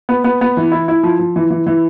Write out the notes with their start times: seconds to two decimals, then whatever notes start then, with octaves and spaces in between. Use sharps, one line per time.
0.09 B3
0.24 B3
0.41 B3
0.57 E3
0.72 E4
0.88 E4
1.03 F3
1.19 F3
1.36 E3
1.51 E3
1.67 E3